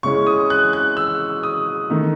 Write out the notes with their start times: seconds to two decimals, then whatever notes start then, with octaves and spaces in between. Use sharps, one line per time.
0.03 C#3 G#3 C#4 E4 C#6
0.27 D#6
0.50 F#6
0.73 F#6
0.97 E6
1.43 D#6
1.90 D#3 A3 D#4